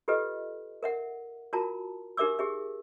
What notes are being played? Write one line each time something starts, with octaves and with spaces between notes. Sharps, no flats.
F4 G4 A4 B4 D#5
A#4 E5 F#5
F4 F#4 A#4 A5 A#5
D#4 G4 A#4 E5 D6 E6
G4 G#4 E5